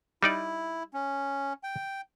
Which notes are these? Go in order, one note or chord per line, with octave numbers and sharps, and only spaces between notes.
G3 D#4 E4 D5
C#4
G5